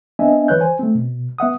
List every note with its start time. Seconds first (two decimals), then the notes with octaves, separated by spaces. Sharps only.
0.19 B3 C4 D4 D#5 E5 G#5
0.48 E3 B4 C#5 F#6 G6
0.61 C5 G#5
0.79 A3 C4
0.95 B2
1.38 B3 E5 F#5 D#6